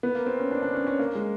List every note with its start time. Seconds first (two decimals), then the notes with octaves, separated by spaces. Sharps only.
0.03 B3
0.15 A#3
0.26 C4
0.39 C#4
0.51 D4
0.63 D4
0.75 C#4
0.87 C#4
0.99 A#3
1.15 G#3